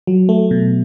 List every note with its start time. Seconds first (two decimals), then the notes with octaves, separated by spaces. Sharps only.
0.07 F#3
0.29 A3
0.51 B2